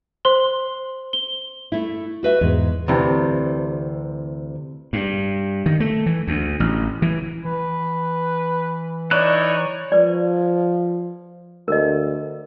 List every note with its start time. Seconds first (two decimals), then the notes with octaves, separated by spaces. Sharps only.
0.25 C5 C6 G7
1.13 G7
1.72 A3 E4
2.23 F#4 B4 E5
2.41 E2 G#2
2.88 D2 C3 E3
4.93 G2
5.66 D#3
5.80 A3
6.06 E3
6.27 D2
6.60 A1
7.02 E3
7.45 E3 B4
9.11 D#4 E4 C#5 D5 F#6
9.92 F3 B4 D5
11.68 D2 A#4 D#5